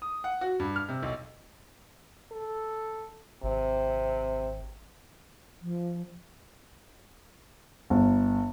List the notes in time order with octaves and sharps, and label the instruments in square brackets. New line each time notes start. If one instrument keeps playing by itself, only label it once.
[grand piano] D#6
F#5
F#4
G2
F6
C3
B1
[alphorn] A4
[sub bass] G#1 [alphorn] C3
[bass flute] F3
[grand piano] G1